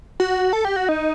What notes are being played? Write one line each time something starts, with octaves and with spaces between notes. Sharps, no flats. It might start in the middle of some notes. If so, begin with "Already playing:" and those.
F#4
A4
G4
F#4
D#4